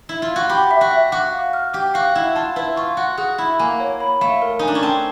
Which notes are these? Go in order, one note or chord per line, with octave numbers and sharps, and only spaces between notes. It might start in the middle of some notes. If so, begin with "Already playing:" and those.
E4
F4
F#4
G4 B5
E5
F#4
E5
F#4 D6
F5
F6
G4 D6
F#4 F5
E4 F#6
F4 A5
E4 B4
F4 C#6
F#4 F#5
F#4 G#4
E4 B5
A#3 G#5
C#5
B5
A3 F5
A#4
D#4 G#5
D4
C#4
C4 A5